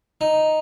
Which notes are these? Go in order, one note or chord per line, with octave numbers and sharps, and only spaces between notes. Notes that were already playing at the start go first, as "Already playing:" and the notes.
D#4